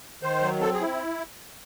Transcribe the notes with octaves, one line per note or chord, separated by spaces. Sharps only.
D#3 C5
F#3
C4 A4
G#4
E4